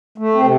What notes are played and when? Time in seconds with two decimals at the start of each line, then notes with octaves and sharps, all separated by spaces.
0.18 A3
0.35 C4
0.43 C3